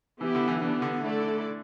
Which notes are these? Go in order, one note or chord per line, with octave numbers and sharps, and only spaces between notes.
E3 B3 E4 G4
D3
E3
E3 B3 D4 G4
D3
A3 E4 A4 D5